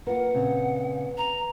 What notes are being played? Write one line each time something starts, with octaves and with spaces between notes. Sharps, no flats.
A#3 F4 A#4 B4 F#5
A#2 C#3 C4
A#5